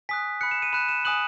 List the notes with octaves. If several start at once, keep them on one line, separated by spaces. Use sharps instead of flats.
G#5 D#6 F#6 B6
B5 F#6 C#7
E7
D#7
B5 F#6 E7
E7
G#5 D#6 F#6 F#7